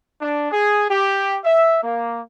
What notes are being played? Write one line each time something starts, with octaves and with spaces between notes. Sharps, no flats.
D4
G#4
G4
E5
A#3